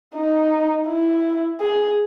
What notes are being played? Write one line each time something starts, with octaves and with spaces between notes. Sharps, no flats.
D#4
E4
G#4